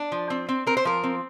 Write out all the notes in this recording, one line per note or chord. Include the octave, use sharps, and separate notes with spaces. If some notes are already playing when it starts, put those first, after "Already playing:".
Already playing: D4
F3
C4
C4
C4 A#4
C5
F3 A#4
C4